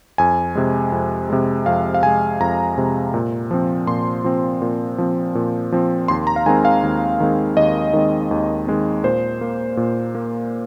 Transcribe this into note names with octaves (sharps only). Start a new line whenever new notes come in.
F2 G#5
C3 G#3
F2
C3 G#3
F2 F5
F5
C3 G#3 G#5
F2 A#5
C3 G#3
A#2
F3 C4
A#2 C6
F3 C4
A#2
F3 C4
A#2
F3 C4
D#2 C6
A#5
F5
D#3 G#3 C4 G#5
F5
D#2
D#3 G#3 C4
D#2 D#5
D#3 G#3 C4
D#2
D#3 G#3 C4
A#2 C5
A#3
A#2
A#3